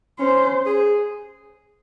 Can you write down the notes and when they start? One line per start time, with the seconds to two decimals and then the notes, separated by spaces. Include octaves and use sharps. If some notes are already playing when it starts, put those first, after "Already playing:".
0.19 C#4 C5
0.66 G#4